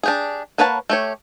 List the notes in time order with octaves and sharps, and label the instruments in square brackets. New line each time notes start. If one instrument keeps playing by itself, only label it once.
[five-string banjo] D4 G4 G#4
A#3 B4 C#5 F#5 A5
A3 G4 C#5